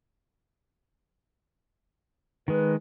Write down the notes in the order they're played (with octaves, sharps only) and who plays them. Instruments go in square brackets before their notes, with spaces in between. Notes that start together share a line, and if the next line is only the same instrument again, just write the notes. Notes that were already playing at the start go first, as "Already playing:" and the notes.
[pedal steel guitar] D#3 G#3 [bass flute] B4